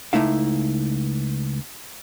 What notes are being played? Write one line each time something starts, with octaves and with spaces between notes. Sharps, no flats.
C#2 C3 A3 D#4 E4 F5